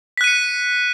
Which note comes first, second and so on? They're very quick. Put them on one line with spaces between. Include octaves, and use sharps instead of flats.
B6 F#6 D#7 C#7